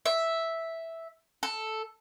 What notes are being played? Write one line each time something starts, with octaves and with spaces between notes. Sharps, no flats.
E5
A4